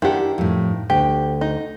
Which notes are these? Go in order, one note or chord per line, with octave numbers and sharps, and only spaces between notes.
D#3 D4 E4 G4 F#5
F2 A2
D2 G4
D#4